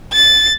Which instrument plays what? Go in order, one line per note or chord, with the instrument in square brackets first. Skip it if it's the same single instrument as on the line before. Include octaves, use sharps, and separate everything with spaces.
[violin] A6